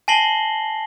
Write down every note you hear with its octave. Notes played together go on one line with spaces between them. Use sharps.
G#5 A5 A#6 C7 F#7 G7